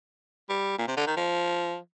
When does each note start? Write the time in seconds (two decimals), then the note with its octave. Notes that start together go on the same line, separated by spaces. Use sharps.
0.49 G3
0.78 A#2
0.88 C3
0.97 D3
1.07 D#3
1.16 F3